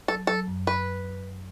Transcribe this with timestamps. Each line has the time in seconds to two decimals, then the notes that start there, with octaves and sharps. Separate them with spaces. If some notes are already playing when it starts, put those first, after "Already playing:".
0.08 F#3 A4
0.27 F#3 A4
0.48 F#2
0.67 B4